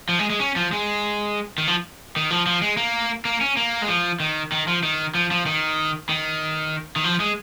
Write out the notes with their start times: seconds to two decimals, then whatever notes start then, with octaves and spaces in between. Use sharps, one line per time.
0.09 F3
0.19 G#3
0.30 G#3
0.40 C#4
0.56 F3
0.73 G#3
1.58 D#3
1.67 F3
2.16 D#3
2.31 F3
2.47 F3
2.62 G#3
2.77 A#3
3.25 A#3
3.41 C#4
3.57 A#3
3.82 G#3
3.88 F3
4.20 D#3
4.52 D#3
4.67 F3
4.83 D#3
5.15 F3
5.31 F3
5.46 D#3
6.09 D#3
6.96 D#3
7.04 F3
7.20 G#3